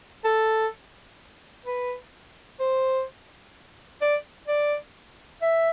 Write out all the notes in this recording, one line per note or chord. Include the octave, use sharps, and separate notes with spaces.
A4
B4
C5
D5
D5
E5